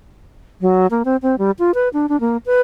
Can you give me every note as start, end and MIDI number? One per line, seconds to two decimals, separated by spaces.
0.61 0.87 54
0.91 1.03 58
1.05 1.17 60
1.22 1.36 60
1.39 1.51 55
1.59 1.74 65
1.74 1.89 71
1.93 2.09 62
2.09 2.19 62
2.20 2.37 58
2.46 2.61 71